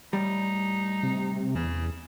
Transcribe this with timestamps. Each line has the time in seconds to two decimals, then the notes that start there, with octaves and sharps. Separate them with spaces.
0.13 A2 G3 D#4
1.03 C3
1.55 E2 C#3